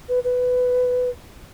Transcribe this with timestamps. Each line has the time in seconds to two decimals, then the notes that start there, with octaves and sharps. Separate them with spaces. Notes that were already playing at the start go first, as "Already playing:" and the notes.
0.09 B4
0.24 B4